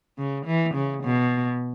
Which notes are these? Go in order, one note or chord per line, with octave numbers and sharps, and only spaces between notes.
C#3
E3
C#3
B2